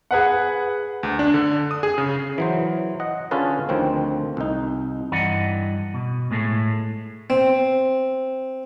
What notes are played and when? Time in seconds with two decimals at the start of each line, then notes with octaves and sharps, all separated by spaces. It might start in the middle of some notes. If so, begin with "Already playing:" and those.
0.11 G#4 B4 F#5
1.03 D2
1.19 D4
1.34 D3
1.71 D#6
1.83 G#4
1.98 C#3
2.38 E3 F#3 C5
3.00 D#5 F#5
3.31 D3 C#4 F4 G#4 A4 B4
3.69 D2 D#3 F3 C4
4.37 C2 D#4
5.12 G2 E3 D5 D#5 F#5 A#5
5.94 B2
6.31 A2 G#3 A3
7.30 C4